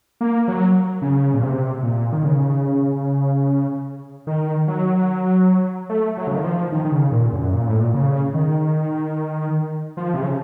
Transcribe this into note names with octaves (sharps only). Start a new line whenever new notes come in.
A#3
F#3
C#3
A#2
C3
A#2
D#3
C#3
D#3
F#3
A3
F#3
C#3
D#3
F3
D#3
D#3
C#3
A#2
F#2
A#2
A2
A#2
C#3
D#3
F3
C3
C#3